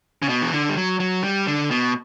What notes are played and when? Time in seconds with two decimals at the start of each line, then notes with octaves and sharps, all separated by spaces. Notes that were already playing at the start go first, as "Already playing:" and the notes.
0.22 C#3
0.29 B2
0.42 E3
0.53 D3
0.69 G3
0.77 F#3
1.00 F#3
1.24 G3
1.47 D3
1.71 B2